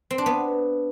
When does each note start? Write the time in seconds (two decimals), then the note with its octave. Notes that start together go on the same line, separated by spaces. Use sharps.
0.11 C4
0.18 D4
0.26 B3